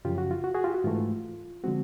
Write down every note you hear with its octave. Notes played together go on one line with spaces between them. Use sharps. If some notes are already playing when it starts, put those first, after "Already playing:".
F#2 C#3 F3 F4 G4
F#4
F4
F#4
F#4 G#4
F4 G4
F#4
G#2 E3 A3 F4
D3 F3 G#3 C4 F#4